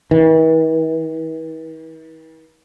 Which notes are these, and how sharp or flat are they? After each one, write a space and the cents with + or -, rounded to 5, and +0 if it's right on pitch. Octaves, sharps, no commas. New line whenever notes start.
E3 -45